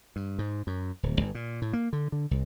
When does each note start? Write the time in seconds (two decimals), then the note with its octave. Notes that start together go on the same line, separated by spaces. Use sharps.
0.16 G2
0.39 G#2
0.67 F#2
1.03 D1
1.21 G1
1.35 A#2
1.62 A2
1.73 A#3
1.93 D3
2.12 D3
2.31 C2